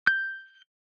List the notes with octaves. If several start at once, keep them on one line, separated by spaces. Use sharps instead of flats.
G6